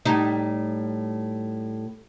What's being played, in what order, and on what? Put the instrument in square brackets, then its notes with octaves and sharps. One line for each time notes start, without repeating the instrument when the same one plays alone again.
[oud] A2 G3 D#4